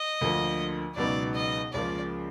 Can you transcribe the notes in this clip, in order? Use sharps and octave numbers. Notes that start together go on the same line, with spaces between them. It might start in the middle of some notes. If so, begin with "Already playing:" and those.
Already playing: D#5
D2 D3 F3 A#3
C#2 B2 F#3 B3 D#4 D5
D#5
C#2 C#3 F3 A#3 D5